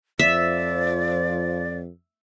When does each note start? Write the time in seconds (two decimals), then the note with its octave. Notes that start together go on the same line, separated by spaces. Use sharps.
0.19 F2 F3 D5 E5